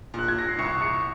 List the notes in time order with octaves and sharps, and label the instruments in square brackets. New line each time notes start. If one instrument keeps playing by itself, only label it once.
[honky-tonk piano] A#2 [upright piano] F#6
[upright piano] G#6
A#6
C7
[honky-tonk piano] C2 [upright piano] C#6 C#7
[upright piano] C#6 C#7